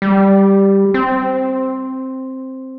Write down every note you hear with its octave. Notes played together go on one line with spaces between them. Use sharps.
G3
C4